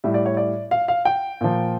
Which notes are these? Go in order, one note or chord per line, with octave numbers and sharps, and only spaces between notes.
A2 G3 E5
D5
C#5
D5
F5
F5
G5
A#2 F3